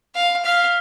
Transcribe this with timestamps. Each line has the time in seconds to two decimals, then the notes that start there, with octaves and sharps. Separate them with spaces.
0.15 F5
0.44 F5 F6 B6 F7